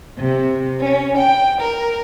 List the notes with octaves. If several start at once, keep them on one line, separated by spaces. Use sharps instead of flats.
C3
C#4
G5
A#4